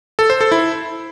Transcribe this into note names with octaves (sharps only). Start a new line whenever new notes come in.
A4
C5
A4
E4